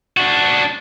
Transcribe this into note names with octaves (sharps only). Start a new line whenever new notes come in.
D4 F#4